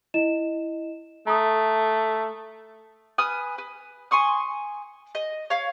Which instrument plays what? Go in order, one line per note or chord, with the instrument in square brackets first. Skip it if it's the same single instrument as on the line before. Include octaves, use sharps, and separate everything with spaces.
[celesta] E4 D#5 E7
[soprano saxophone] A3 [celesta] A#5 D#6
[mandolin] B4 G#5 D#6 F6
B4
G#5 C6 C#6 D#6
D#5
C#5 F5